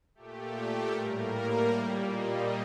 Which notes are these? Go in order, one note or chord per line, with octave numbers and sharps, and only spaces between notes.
A#2 A3 G4
G4
A2 G3 A#3 A#4
A#2 G3 A#3
D#5